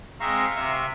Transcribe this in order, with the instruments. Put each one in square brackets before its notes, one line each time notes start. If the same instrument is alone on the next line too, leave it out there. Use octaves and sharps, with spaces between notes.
[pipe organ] G#3 C4 E5 [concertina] F5 A#5 C#6
[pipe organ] C3 E5